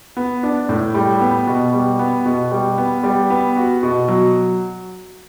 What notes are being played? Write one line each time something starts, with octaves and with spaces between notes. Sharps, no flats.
B3
D4
A2
G3
B3
B2
G3
B3
B2
G3
B3
G3
B3
F#4
B2
F#3